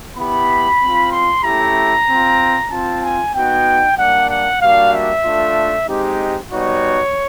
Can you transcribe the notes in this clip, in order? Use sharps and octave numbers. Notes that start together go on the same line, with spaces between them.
B3 E4 G4 B5
C4 F4
C6
A3 C#4 E4 G4 A#5
C4 F4
C4 F4 A5
G#5
B3 D#4 F#4 G5
G3 A#3 D4 F#5
F#5
G3 A#3 D4 F#4 F5
E5
A3 D4 F4
G#3 C4 D#4 G4
G3 B3 D#4 F#4 C#5